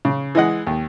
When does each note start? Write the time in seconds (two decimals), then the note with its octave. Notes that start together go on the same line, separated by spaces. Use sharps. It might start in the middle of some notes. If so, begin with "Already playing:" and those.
0.05 C#3
0.35 E3 G#3 D#5 F#5
0.67 D#2